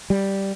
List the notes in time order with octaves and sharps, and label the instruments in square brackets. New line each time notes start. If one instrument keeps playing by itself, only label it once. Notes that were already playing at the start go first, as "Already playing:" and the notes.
[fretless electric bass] G3